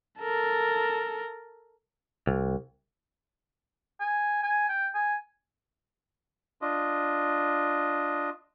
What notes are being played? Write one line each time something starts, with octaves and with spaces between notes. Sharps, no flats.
A4 A#4
C2
G#5
G#5
G5
G#5
D4 F4 D#5